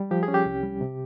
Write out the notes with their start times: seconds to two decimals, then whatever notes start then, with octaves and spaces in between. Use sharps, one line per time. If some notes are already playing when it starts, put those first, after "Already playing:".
Already playing: G3
0.11 F3 G4
0.23 G#4
0.28 C#4
0.34 G4
0.46 C2
0.63 G3
0.81 C3